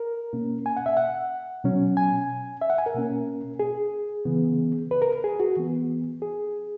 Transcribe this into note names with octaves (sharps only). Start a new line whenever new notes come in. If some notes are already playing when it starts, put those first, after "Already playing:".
Already playing: A#4
B2 A#3 C#4
G#5
F#5
E5
F#5
B2 F#3 C#4
G#5
E5
F#5
G#5
A#4
B2 A#3 C#4
G#4
C#3 E3 B3
B4
A#4
G#4
F#4
E3 B3
G#4